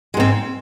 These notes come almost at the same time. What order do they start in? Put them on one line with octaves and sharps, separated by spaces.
G#3 G#2 C4